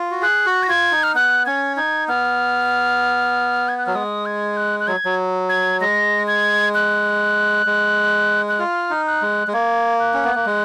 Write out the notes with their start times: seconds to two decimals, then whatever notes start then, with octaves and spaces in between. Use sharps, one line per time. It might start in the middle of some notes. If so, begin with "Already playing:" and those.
Already playing: F4
0.11 F#4
0.21 G#4 F#6
0.46 F#4
0.63 A#6
0.68 F4 G#6
0.91 D#4
1.03 F6
1.15 B3 F#6
1.46 C#4 G#6
1.77 D#4 G#6
2.08 B3 F6
3.68 G#6
3.78 F#6
3.86 F#3 F6
3.94 G#3 D#6
4.26 G#6
4.57 F#6
4.80 F#6
4.87 F#3 G#6
5.05 F#3
5.49 G#6
5.81 G#3 A#6
6.27 G#6
6.74 F#6
7.66 G#3
8.48 F#6
8.59 F4 F6
8.90 D#4
9.07 F#6
9.22 G#3
9.47 G#3
9.53 A#3 G#6
9.99 F#6
10.14 C#4
10.24 B3
10.35 A#3
10.46 G#3